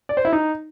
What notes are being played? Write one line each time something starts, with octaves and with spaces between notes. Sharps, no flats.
D5
C5
E4
D#4